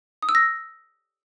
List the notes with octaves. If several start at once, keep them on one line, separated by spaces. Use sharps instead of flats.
D#6
E6
A#6